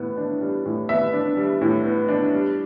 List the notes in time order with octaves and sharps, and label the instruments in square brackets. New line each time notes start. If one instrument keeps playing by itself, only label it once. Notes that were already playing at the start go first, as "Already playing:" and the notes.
Already playing: [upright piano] A2 B3
D4
G3
A2
B3 E5
D4
G3
A2
B3
D4
G3